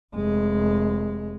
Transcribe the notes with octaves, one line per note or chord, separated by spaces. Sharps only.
F1 G#3